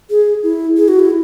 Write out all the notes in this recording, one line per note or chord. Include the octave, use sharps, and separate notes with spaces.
G#4
E4
G#4
F#4
E4